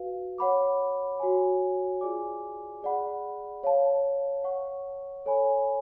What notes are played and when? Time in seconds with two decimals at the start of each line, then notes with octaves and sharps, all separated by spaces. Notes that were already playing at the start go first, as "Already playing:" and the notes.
Already playing: F#4 B4 F5
0.38 C#5 F#5 B5 D6
1.20 F#4 C#5 G#5
2.01 F4 G#4 D5 G#5 D6
2.82 G#4 D5 F#5 B5
3.63 C#5 F5 A5
4.44 C#5 F#5 C#6
5.26 A4 C#5 G#5 B5